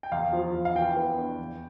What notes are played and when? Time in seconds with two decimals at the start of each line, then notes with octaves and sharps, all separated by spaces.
0.03 G5
0.12 E2 F5
0.32 F3
0.54 E2
0.65 F5
0.75 E3 G5
0.97 B3
1.18 D4
1.39 E2